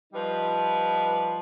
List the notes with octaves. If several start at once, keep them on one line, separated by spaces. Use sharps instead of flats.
F3 G3 D#4 B4